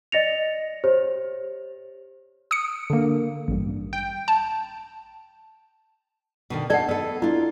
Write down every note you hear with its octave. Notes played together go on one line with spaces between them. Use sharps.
D5 D#5 A6 A#6 C#7 F7
G4 C5 C#5
D#6 C#7
D3 A#3
A1 G2
G5
A5
B2 D3 D#3
D#4 A4 D5 F#5
B3 A4 E6
D4 E4 F4